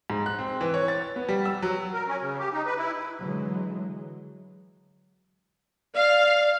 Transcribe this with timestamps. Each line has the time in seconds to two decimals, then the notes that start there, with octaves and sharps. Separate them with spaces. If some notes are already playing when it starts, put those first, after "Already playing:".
0.10 G#2
0.26 F#6
0.39 C4
0.61 E3
0.74 C#5
0.88 A6
1.16 B3
1.29 G3
1.45 E6
1.62 F#3
1.94 A#4
2.08 C#4
2.22 C#3
2.39 G4
2.53 D#4
2.66 B4
2.78 E4
3.19 D3 E3 F#3 G#3
5.95 D5 F5